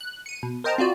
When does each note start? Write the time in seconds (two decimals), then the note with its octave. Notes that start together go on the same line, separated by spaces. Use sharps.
0.01 F#6
0.26 C#7 D#7
0.43 B2
0.64 A#4 C5 D#5 G5 A5 A#5
0.78 C4 F4 F#4 D5